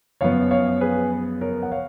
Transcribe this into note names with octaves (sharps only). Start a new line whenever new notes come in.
F#2 F3 B3 C#5 F5
C#5 F5
G#4 B4
A#4 C#5
F#5
C#5 F5